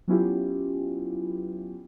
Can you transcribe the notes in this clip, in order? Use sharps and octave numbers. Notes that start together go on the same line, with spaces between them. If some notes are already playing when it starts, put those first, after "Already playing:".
F#3 B3 C#4 E4 F4 G4